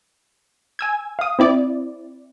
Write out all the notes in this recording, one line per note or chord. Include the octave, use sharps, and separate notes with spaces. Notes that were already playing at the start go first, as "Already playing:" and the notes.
G#5 E6 G#6
F5 D#6
C4 E4 D5